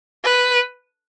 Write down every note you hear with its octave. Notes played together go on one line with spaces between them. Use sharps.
B4